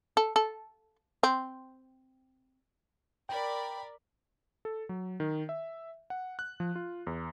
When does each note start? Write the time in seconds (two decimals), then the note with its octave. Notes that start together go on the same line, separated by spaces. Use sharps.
0.17 A4
0.36 A4
1.23 C4
3.29 A#4 D5 G5 B5
4.65 A4
4.89 F#3
5.20 D#3
5.49 E5
6.10 F#5
6.39 F#6
6.60 F3
6.75 F4
7.07 E2